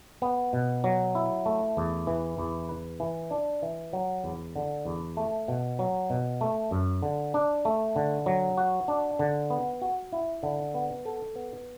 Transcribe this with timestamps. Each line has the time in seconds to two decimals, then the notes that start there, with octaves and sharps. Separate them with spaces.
0.22 B3
0.53 B2
0.84 F#3
1.15 E4
1.46 A3
1.77 E2
2.07 E3
2.38 E2
2.69 B4
3.00 E3
3.31 D4
3.62 E3
3.93 F#3
4.24 E2
4.56 D3
4.85 E2
5.17 A3
5.48 B2
5.79 F#3
6.10 B2
6.41 A3
6.71 F#2
7.03 D3
7.34 D4
7.65 A3
7.96 D3
8.26 F#3
8.58 F#4
8.88 D4
9.19 D3
9.50 B3
9.82 F#4
10.13 E4
10.43 D3
10.74 B3
11.05 A4
11.35 B3